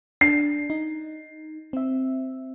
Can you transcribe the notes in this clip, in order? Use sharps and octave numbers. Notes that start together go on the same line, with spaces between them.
D4 C7
D#4
C4 E5